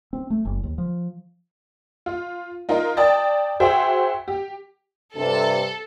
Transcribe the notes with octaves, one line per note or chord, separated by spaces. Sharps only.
C4
A3
F#1
D#2
F3
F4
D#4 F4 A#4
D5 G5 A5 D#6 A6
F#4 G#4 C5 E5 G5
G4
G2 C3 A4